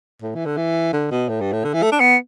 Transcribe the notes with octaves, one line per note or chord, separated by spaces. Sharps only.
A2
E3
D3
E3
D3
B2
A2
G2
A2
D3
E3
A3
D4
B3